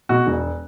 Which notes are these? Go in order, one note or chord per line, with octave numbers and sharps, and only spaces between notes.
B2 F#4
E1